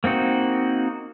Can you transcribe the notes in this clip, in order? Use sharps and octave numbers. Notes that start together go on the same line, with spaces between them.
A#3 C4 D#4 F#4